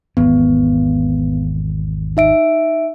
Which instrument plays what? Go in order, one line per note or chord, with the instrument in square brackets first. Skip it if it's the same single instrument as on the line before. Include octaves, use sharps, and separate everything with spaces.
[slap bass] G#1 E2 [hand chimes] B3
[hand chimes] D#4 E5 D7